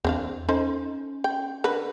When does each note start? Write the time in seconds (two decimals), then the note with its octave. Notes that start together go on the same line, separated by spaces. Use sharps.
0.05 E2 C4 D4 F5
0.49 C#4 D#4 A4 C5
1.24 G5
1.64 D3 A#4 B4